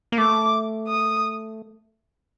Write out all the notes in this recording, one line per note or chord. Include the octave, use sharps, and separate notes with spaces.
A#3
A3 D6
D#6